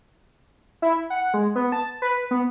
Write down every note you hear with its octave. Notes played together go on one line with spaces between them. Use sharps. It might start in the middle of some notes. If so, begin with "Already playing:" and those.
E4
F#5
G#3
B3
A5
B4
B3